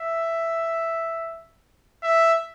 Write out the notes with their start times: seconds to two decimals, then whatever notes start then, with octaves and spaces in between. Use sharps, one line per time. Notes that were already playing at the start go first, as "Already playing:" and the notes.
Already playing: E5
2.03 E5